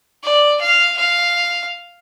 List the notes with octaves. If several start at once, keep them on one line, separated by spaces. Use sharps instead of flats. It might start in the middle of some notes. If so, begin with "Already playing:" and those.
D5
F5
F5